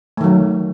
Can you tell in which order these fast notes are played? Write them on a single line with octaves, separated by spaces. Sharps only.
A3 D#3 F#3